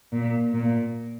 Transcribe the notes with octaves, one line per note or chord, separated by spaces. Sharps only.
A#2
A#2